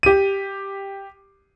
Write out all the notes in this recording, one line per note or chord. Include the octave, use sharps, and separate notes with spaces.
G4 D#7